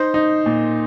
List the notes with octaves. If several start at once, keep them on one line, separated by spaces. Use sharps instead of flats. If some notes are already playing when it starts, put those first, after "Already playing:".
Already playing: D#4 C5
D#4
A#2